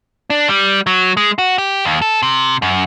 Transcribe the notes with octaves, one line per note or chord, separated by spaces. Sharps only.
D4
G3
F#3
G#3
F#4
G4
D#2
A4
C3
F#2